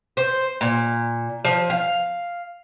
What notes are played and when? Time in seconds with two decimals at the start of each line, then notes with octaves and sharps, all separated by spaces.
0.17 C5
0.61 A#2
1.44 F3
1.70 F5